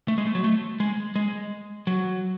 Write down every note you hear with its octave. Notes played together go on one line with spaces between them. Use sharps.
A3
G#3
A3
F#3
A3
G#3
G#3
F#3